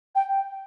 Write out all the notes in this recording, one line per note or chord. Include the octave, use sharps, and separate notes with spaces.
G5